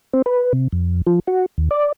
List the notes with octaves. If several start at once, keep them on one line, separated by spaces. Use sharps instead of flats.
C4
B4
C3
F2
F3
F#4
D#2
D5